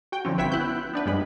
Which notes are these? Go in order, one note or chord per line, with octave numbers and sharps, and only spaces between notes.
F#4 G5
D3 E3 F3 C4 C#4
G1 B4 C#5 E5 G5 B6
B3 E4 F#6 G6
B3 D4 B4
F#2 G3 G#3 B5